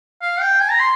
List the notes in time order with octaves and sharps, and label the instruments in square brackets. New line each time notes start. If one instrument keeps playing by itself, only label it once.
[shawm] F5
G5
G#5
A#5
C6